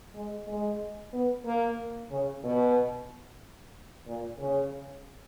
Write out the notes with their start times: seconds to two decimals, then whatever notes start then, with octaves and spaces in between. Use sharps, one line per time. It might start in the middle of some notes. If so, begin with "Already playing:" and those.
0.15 G#3
0.48 G#3
1.13 B3
1.45 A#3
2.11 C#3
2.44 B2
4.07 A#2
4.39 C#3